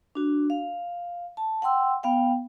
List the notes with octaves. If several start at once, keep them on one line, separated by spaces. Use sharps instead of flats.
D4 F#4
F5
A5
F#5 G5 C6 E6
B3 F5 G5